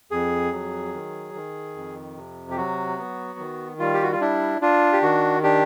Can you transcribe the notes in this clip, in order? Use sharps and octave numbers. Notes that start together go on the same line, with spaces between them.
F2 G#4
F#3
D#3
D#3
F2
C3
G4
F#3 F#4
B3
D#3
G3 F4
G4
F#4
F4
D4 E4
D4 F4
G4
D#3 F#4
D4 G4